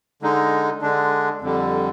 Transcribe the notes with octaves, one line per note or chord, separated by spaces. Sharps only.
D3 G#3 D#4
D3 G#3 D4
F2 D3 G3